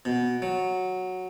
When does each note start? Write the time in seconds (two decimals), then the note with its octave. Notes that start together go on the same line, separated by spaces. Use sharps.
0.05 B2
0.42 F#3